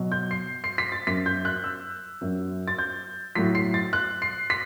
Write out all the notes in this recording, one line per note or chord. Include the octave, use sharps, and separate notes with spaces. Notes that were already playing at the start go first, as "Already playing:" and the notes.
Already playing: B2 F#3
G6
C7
C7
B6
A6
F#2 F#3 B6
G6
F#6
E6
F#2 F#3
A6
G6
A2 F#3 B6
C7
A6
F#6
C7
B6